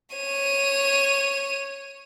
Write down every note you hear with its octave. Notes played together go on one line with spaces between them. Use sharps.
C#5 D#7